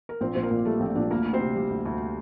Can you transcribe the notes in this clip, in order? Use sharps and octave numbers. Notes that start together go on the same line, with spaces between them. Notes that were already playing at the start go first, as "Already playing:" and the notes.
A#4
A#1 C4 C5
A#1 C5
A#3 A#4
A#2
G3 A3 A4
A#1 C4
A#1 D4
D2 A#3 A#4
D2
C4 C5
C3
G3
D2
D2